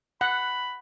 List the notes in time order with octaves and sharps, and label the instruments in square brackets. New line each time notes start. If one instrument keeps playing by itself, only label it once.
[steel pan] F#5 [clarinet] B5